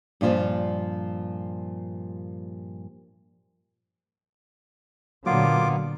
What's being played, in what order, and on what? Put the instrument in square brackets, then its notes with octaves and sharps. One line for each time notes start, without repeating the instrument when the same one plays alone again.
[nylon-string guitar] G2 A#2 F3 G3
[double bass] A#2 D3 [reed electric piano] F#3 [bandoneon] A#3 B3 [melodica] F4 D6